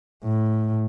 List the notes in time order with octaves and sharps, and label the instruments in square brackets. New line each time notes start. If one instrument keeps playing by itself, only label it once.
[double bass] A2